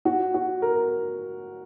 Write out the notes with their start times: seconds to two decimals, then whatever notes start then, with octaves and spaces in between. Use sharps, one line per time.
0.05 F#4
0.34 F#4
0.62 A#4